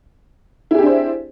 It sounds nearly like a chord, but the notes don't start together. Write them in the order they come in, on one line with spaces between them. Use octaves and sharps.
E4 G#4 G4 D4 C5